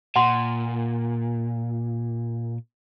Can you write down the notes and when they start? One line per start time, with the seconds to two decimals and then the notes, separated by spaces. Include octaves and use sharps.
0.16 A#2 F#5 C6